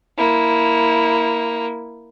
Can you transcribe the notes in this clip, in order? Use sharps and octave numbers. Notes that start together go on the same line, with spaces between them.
A#3 E4